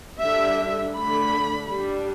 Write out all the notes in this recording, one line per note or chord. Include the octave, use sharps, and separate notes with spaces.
D3 G3 D4 E5
D3 A3 D4 B5
G3 D4